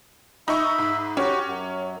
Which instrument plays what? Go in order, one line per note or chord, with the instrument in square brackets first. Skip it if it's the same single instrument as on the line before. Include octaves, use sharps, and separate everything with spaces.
[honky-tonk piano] D#4 C#6 [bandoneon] E5 B5
[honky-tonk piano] G#2
[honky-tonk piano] C#4 [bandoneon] F#4 G4
[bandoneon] F#2